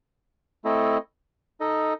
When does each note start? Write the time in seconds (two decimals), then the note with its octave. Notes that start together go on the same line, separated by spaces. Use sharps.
0.64 A3 C4 E4 A4 D#5
1.60 D#4 A4 D#5